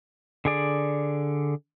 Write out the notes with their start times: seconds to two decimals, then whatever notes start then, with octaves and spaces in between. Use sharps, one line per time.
0.45 D3 G#4 D5